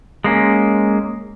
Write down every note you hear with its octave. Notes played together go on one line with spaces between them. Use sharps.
G#3 A#3 C#4